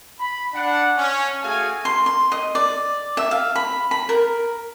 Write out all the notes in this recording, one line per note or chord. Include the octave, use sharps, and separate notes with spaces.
B5
D4 F#5
C#4
A3 F#4 G#4 F5 G#5
C6
C6
D#5
D5
E5
F5
B5
B5
A#4